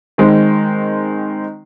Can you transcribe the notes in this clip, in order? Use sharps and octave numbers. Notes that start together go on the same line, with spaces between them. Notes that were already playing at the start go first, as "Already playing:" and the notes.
D#3 G#3 C4